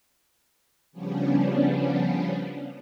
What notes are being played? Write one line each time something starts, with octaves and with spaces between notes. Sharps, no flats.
C#3 F3 G3 B3 C#4 D4